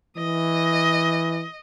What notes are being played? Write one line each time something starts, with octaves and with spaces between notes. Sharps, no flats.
E3 D#5